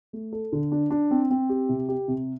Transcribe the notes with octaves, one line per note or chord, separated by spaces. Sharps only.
A3
A4
D3
D4
D4
C4
C4
G4
C3
G4
C3